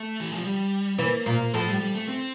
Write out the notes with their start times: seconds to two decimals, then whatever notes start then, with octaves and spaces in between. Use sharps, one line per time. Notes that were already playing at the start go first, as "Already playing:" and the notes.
Already playing: A3
0.20 E3
0.33 F3
0.44 G3
0.98 E3 A#3
1.26 A#2 A#3
1.53 A2 F3
1.68 G3
1.81 G3
1.95 A3
2.09 C4